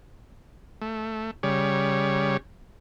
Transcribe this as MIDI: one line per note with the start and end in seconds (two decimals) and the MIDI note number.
0.82 1.31 57
1.43 2.37 49
1.43 2.37 55
1.43 2.37 73